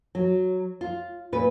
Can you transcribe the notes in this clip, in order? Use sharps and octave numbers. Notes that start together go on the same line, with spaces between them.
F#3
F4
A#2 B4